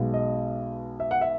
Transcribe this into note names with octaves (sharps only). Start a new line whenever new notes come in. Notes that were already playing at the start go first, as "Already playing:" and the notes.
Already playing: B1 B2 G#3 B3
D#5
E5
F#5
E5